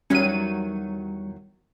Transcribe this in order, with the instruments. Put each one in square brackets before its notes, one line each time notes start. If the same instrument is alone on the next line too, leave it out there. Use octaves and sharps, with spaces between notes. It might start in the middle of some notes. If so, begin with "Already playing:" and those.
[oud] E2 D#3 F#3 [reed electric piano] G3 [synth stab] C#4 D#7